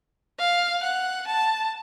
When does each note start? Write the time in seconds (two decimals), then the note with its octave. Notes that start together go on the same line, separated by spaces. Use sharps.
0.39 F5
0.83 F#5
1.27 A5